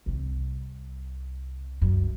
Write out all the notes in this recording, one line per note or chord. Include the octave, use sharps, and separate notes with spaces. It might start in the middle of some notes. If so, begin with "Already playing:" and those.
C2 C3
F#2